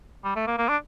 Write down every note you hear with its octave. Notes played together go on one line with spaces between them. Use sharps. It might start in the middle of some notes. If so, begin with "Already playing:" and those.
G3
A3
A#3
A#3
D4